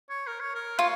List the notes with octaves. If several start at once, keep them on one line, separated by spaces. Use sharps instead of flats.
C#5
A#4
C#5
A#4
F4 C#5